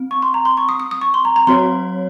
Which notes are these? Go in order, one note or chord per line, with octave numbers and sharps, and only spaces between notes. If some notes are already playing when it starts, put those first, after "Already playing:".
Already playing: C4
C#6
C6
A#5
C6
C#6
D#6
D#6
D#6
C#6
C6
A#5
A#5
F#3 C4 F#4 C#5 C6